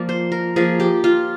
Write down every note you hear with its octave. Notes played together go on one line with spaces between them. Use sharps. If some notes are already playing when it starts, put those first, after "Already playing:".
Already playing: F3 A#3 D5
C5
A#4
F3 A#3 G#4
G4
F4